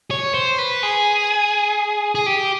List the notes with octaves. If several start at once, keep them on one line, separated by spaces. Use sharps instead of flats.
C#5
C5
B4
G#4
G#4
G4